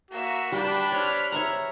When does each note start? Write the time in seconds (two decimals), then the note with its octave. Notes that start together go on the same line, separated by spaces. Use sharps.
0.11 A#3 F#4 E5
0.52 G3 D4 B4 G5 A5 B5
0.92 C5 C#5 F6
1.32 C#5 E5 A#5